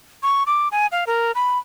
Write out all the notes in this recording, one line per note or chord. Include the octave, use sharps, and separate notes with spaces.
C#6
D6
G#5
F5
A#4
B5